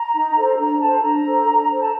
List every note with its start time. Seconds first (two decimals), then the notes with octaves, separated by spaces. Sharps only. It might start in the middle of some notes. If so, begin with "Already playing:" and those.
Already playing: A#5
0.14 D#4
0.37 A4 C5
0.58 D4 A#5
0.80 A4 C5 A5
1.03 D4 A#5
1.25 A4 C5
1.47 D4
1.69 A4 C5
1.81 A5